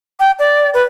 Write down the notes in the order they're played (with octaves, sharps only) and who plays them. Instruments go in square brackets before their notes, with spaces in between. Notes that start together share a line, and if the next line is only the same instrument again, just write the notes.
[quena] G5
D5
B4